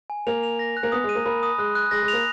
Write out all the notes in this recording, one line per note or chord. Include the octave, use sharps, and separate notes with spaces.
G#5
A#3 F7
F7
A#6
F#6
A#3
B3 D#6
G#3
D#7
A#3
A#3 B5
D#6
G#3 F#6
F#6
G#3 A#6
G#3
F7
A#3